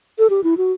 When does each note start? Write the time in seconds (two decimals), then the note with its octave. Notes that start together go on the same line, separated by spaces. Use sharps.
0.19 A4
0.30 G4
0.44 E4
0.57 F#4